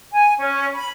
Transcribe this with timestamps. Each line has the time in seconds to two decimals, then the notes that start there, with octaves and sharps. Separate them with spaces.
0.13 G#5
0.39 C#4
0.74 B5